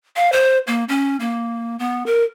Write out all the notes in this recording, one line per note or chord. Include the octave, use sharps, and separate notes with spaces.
F5
C5
A#3
C#4
A#3
B3
A#4